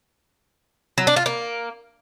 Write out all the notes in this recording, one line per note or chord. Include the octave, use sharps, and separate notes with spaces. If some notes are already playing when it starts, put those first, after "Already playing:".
F#3
D4
F4
A#3